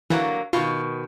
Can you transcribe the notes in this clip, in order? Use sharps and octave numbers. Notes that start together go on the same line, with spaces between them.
D3 E3 F#3 A#3
B2 D#3 F4